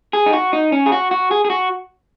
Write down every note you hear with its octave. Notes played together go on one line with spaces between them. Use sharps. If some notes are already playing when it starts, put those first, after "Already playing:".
G#4
D#4
F#4
D#4
C#4
G#4
F#4
F#4
G#4
G#4
F#4